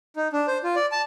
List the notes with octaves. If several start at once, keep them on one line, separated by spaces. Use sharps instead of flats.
D#4
D4
C5
F4
D5
A5